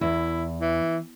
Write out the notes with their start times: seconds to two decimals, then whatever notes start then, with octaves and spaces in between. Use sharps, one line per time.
0.01 E2 E4
0.61 E3